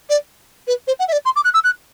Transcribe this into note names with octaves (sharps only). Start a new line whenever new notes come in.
D5
B4
C5
F#5
E5
D5
C6
D6
F#6
E6
F#6